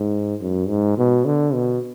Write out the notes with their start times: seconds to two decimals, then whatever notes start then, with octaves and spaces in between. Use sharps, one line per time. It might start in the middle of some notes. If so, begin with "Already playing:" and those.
Already playing: G#2
0.41 F#2
0.68 G#2
0.98 B2
1.25 D3
1.54 B2